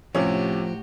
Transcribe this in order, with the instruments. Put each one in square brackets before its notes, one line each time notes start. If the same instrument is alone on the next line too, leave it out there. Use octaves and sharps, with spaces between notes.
[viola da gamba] A2 F#4 G4 [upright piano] C3 C#4 [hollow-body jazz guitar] F3